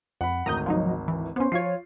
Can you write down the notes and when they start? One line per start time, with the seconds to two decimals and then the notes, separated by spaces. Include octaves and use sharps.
0.21 F2 F#5 B5
0.46 G#1 D2 A#5 D#6 G6
0.66 F3 F#3 D#4
1.08 E3
1.36 B3 C#4 C5 C6
1.52 F3 F4 C#5 C7